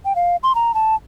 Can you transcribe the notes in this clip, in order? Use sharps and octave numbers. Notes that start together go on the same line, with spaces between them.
G5
F5
C6
A#5
A5